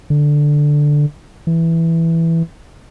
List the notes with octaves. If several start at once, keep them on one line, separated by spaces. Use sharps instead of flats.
D3
E3